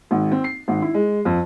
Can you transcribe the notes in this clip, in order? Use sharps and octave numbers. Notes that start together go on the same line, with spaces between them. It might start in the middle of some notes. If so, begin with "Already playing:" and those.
G#1
C4
C7
G#1
E4
G#3
F2